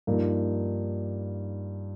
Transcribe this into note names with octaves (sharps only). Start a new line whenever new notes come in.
G2 F3 A#3 D#4 A#4